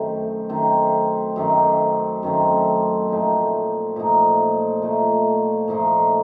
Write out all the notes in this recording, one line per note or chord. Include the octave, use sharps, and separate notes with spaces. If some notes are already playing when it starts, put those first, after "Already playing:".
Already playing: F#2 D#3 A3 C4
F#2 D#3 A3 C4
F#2 D#3 A3 C4
F#2 D#3 A3 C4
A#2 F3 A3 D#4
A#2 F3 A3 D#4
A#2 F3 A3 D#4
A#2 F3 A3 D#4